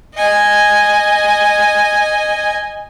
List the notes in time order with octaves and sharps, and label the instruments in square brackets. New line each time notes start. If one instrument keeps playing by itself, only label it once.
[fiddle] D#5 G#5